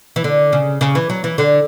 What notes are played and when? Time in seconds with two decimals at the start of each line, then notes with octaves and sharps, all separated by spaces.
0.16 E3
0.24 D3
0.53 C#3
0.81 C#3
0.95 E3
1.10 F#3
1.24 E3
1.38 D3